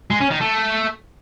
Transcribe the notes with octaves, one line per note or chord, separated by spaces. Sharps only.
G#3
C#4
D#3
A3